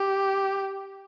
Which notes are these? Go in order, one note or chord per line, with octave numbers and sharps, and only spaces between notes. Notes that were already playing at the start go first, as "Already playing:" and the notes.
Already playing: G4